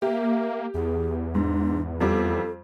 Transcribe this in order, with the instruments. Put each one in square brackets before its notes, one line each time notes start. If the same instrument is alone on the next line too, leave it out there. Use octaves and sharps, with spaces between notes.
[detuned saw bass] A#3 [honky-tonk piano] G4 [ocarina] E5
[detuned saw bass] E2 [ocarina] G#4
[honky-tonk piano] G#2 [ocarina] D4
[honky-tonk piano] F2 G3 D6 [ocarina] A4